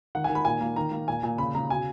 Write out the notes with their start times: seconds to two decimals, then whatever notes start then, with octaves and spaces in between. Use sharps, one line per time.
0.15 D#3 F#5
0.24 G#5
0.29 D#3
0.35 B5
0.45 A#2 G#5
0.60 A#3
0.76 D#3 A#5
0.91 A#3
1.08 A#2 G#5
1.23 A#2 G#5
1.38 C#3 B5
1.55 C#3 A#5
1.69 B2 G#5